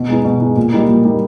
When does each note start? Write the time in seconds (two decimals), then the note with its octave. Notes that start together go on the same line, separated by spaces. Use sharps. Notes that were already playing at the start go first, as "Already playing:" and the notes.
Already playing: B2
0.08 G#3 B3 D#4
0.25 B2
0.40 G#3 B3 D#4
0.56 A#2
0.73 G3 A#3 D#4
0.89 A#2
1.05 G3 A#3 D#4